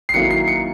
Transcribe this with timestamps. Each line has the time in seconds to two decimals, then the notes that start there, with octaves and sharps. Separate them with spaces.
0.09 C7
0.14 D#3 F#3 A#3 C#4 E4 C#7
0.31 C7
0.48 C#7